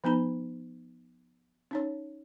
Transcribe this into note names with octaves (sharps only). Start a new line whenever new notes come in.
F3 B3 D#4 B5
C#4 D#4 C#5